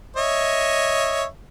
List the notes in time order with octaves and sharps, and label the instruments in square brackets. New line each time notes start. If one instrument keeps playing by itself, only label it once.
[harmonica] C#5 D#5 E5